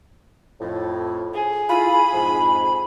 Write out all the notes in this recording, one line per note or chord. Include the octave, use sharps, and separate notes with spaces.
F2 A2
G#4
E4 F4 B5
F2 G#2